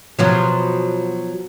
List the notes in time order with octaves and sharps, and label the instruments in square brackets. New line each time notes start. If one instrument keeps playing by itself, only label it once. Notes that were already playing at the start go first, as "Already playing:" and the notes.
[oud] B2 F3 F#3